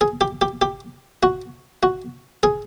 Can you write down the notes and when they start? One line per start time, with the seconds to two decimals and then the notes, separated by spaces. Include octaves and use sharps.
0.01 G#4
0.21 G4
0.41 G4
0.62 G4
1.23 F#4
1.83 F#4
2.43 G#4